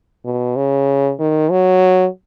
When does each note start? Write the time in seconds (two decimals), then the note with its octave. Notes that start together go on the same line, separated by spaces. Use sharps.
0.25 B2
0.56 C#3
1.19 D#3
1.51 F#3